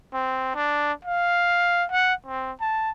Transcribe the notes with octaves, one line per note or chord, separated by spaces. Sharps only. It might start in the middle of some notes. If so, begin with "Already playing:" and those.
C4
D4
F5
F#5
C4
A5